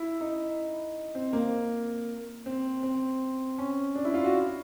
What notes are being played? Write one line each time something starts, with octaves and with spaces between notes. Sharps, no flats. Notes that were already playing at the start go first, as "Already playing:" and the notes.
Already playing: E4
D#4
C4
A#3
C4
C4
C#4
D4
E4
F4
F#4